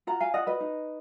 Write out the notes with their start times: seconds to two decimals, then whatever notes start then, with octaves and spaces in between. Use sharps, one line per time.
0.07 F4 F#5 A#5
0.20 F5 G#5
0.34 F4 D#5 F#5
0.47 B4 D#5
0.60 D#4